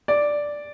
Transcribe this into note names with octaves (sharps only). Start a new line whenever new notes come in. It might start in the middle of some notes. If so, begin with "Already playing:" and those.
D5